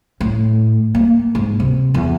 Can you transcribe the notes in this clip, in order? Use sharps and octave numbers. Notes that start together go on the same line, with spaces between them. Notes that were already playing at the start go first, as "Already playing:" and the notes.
A2
A#3
G#2
C3
E2